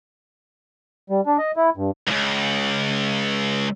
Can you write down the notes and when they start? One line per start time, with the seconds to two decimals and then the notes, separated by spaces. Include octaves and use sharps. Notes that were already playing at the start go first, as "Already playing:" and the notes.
1.10 G3
1.26 D4
1.38 D#5
1.57 E4
1.77 G2
2.07 C#2 G2